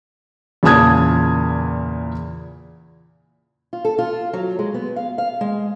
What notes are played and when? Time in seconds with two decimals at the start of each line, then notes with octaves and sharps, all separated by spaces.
0.63 E2 A#2 C#3 A5 D#6 G#6
3.73 F4
3.85 A4
3.98 F4
4.33 F#3
4.59 G#3
4.74 B3
4.96 F5
5.18 F5
5.41 G#3